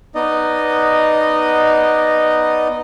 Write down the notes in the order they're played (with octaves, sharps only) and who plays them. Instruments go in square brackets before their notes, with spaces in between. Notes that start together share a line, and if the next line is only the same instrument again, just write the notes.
[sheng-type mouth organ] B3 D#4 D5 D#5